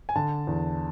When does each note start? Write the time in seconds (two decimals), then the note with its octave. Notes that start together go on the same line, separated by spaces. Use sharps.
0.09 G#5
0.15 D3 A5
0.47 E2